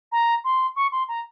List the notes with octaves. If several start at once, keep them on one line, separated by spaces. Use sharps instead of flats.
A#5
C6
C#6
C6
A#5